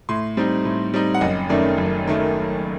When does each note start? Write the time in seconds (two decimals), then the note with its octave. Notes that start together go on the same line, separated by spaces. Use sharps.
0.09 A2 C6
0.37 G3 C4 D#4
0.65 A2
0.94 G3 C4 D#4
1.14 F#5
1.21 F#1 D#5
1.49 F#2 D#3 A3 D5
1.77 F#1
2.08 D#3 A3